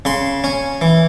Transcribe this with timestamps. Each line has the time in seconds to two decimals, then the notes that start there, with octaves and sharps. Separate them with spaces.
0.05 C#3 C6
0.44 C#4
0.81 E3